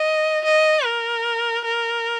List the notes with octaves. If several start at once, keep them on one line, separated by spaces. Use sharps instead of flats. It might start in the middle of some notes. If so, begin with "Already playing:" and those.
Already playing: D#5
D#5
A#4
A#4